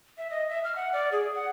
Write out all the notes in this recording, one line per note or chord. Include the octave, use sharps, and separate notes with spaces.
E5
D#5
E5
F6
F#5
D5
G#4
F#5